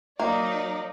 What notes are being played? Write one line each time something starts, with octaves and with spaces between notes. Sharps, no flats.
F#3 A#3 D#4 D5